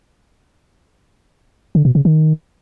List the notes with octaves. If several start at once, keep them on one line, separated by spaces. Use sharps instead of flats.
D3
B2
C#3
D#3